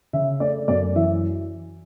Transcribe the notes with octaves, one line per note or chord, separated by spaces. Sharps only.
C#3 E5
A3 D5
F#2 D5
E3 E5